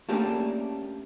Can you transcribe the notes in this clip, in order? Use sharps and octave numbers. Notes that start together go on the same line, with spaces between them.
A3 A#3 C#4 D4 G4 A#4